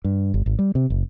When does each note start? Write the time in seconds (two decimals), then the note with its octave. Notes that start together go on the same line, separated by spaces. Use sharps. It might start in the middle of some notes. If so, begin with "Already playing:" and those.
0.04 G2
0.34 G1
0.46 G#1
0.59 G3
0.75 C3
0.90 F#1